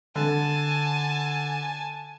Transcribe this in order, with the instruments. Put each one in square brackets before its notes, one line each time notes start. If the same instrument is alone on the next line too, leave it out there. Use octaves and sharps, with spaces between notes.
[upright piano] D3 [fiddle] G#5 A5